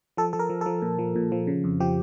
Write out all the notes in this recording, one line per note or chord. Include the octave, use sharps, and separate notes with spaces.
F3 A4
F3 A4
A#4
F3
F3 A4
A#2
F3
A#2
F3
C#3
F2
F3 G4